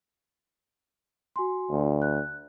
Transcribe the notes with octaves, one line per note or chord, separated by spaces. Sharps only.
F#4 G#5 C6
D2
F#6